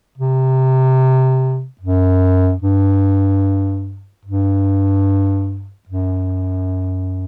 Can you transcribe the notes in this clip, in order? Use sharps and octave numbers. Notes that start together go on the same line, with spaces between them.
C3
F#2
G2
G2
F#2